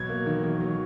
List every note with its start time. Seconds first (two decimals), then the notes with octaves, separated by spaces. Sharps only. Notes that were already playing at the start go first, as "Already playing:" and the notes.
Already playing: B2 F#3 G#6
0.09 A#3
0.26 D#3
0.43 D#3
0.60 F#3